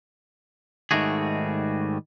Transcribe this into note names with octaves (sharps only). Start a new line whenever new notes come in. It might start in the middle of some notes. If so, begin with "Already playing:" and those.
G#2 D#3 G3 A3 F#4 G#4